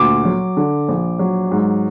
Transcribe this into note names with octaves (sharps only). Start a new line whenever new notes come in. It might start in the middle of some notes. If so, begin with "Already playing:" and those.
Already playing: D2 A#2 D6
F#3
D3
A#1
F#3
G#2